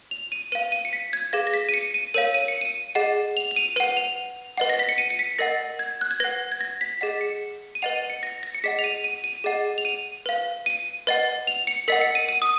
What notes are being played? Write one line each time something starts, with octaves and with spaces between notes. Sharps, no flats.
F7
D#7
B4 F5 D#7
D#7
C#7
B6
G#6
G#4 B4 F5 A#6
A#6
B6
D#7
C#7
D#7
A#4 C#5 F5 D#7
D#7
C#7
D#7
G#4 D#5 F#5
F7
F7
D#7
B4 F#5 D#7
F7
B4 D#5 F#5
A#6
B6
C#7
D#7
C#7
B6
A#4 D#5 F#5 A#6
G#6
F#6
G#6
B4 F#5 A#6
G#6
A#6
B6
G#4 D#5 F#5 B6
C#7
D#7
B4 D#5 F#5 F7
D#7
C#7
A#6
A#6
C#7
G#4 D#5 F#5 B6
F7
D#7
D#7
D#7
G#4 D#5 F#5
F7
D#7
B4 F5
D#7
B4 D#5 F#5
F7
C#7
A#4 D#5 F#5 B6
C#7
D#7
D#7
D#6